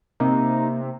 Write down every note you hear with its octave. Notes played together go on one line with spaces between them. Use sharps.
C3 A#3 D#4